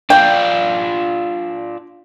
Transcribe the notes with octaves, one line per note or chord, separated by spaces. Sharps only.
D4 F4 G5